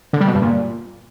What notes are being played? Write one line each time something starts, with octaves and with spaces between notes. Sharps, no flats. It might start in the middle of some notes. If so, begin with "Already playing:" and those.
D3
G3
B2
G2
A#2